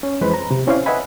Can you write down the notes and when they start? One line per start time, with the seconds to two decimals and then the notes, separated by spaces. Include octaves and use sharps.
0.03 C#4
0.21 F2 E3 G#3 B4 C5 B5
0.34 A#5
0.51 C3
0.67 C4 C#4 E4 C5 D5 F5
0.86 B4 D#5 E5 F#5 G#5 B5